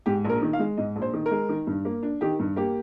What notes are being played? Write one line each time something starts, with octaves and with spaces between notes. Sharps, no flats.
G#2 G4
A#1 A#4
D#3
F5
G#3
G#2 D#5
A#1
C5
D#3
A#4
G#3
D#3
G2
A#3
D4
D#3 G4
G2
A#3 G4